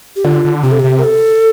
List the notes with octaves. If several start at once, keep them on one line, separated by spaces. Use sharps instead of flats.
G4
D3 F4
D3
C3 G4
A4
C3 G4
A#4
A4